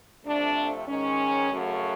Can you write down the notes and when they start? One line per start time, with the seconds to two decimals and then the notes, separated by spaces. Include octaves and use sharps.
0.24 F2 C3 F3 A3 D4
0.87 G#2 D#3 G#3 C#4
1.50 F#2 C#3 F#3 A3